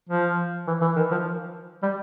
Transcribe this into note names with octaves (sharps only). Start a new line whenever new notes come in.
F3
E3
E3
D#3
F3
G3